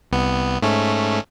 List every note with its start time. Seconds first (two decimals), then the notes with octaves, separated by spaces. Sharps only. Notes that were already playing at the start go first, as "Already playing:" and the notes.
0.11 C2 B3
0.62 G#2 A3 C#4